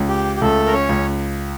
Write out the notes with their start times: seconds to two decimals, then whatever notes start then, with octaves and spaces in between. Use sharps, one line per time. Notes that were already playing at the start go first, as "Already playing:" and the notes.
Already playing: C#2
0.09 G4
0.36 G4
0.41 C#2 A3 A4
0.66 A#4
0.73 C#4 C#5
0.89 C#2